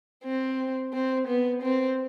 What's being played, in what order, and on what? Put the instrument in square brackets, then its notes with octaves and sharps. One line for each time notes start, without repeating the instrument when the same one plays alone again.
[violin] C4
C4
B3
C4